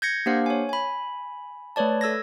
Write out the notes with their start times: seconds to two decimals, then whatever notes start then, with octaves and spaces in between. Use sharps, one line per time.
0.02 G6 G#6 A#6 C#7
0.26 A#3 D4 G4 C5 F5 F#5
0.46 C#5 G#5
0.69 G#5 B5
1.76 A3 B4 C#5 D5 A5
2.01 A4 E6 G#6 A#6